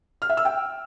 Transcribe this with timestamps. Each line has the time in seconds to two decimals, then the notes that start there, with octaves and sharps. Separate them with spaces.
0.22 F6
0.29 E5
0.37 E6
0.45 G5